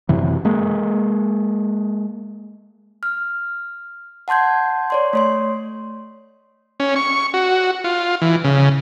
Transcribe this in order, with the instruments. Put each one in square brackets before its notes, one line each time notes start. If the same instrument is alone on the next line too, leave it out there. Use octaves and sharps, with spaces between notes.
[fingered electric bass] F#2 C3 E3
G#3 A#3
[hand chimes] F6
F#5 A5 C6 G6 G#6
C#5 D5 C6
A3 C#5 C6
[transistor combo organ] C#4
C#6
F#4
F4
E3
C#3